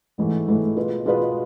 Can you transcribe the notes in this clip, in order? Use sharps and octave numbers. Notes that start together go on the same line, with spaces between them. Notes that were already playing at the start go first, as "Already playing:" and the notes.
A1 G#2 E3 A3
A1 G#2 E3 A3
B2 G#3 B3 F4 B4
B2 G#3 B3 F4 B4